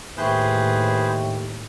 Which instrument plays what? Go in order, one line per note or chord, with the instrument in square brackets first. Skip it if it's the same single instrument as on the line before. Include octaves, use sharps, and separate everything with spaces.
[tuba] D#2 [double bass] A2 [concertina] G#4 B4 C5 [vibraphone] E5 G5 C#6